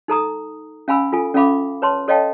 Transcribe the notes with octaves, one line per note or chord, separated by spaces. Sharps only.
D#4 A4 A#5 D#6
C#4 F5 G#5 B5 E6
F4 A4 G#5
C#4 A4 E5 F5 B5 D6
B4 C#5 A5 C6
A4 C#5 D#5 F5 G5 A5